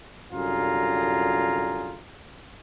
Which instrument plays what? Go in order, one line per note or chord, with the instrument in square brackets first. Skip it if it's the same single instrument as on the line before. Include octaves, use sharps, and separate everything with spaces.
[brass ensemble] C2 F#2 D3 F4 G#4 A#5